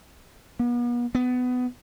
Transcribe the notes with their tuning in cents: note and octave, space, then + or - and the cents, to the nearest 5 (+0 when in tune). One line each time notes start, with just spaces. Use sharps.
B3 -40
B3 +20